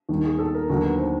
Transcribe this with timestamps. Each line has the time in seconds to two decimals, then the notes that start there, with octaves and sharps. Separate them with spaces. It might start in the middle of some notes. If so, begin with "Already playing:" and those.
0.09 D#2 D#3 G3
0.24 G#4
0.39 A4
0.55 A#4
0.69 D#2 D3 F#3 A#4
0.84 B4
0.99 C5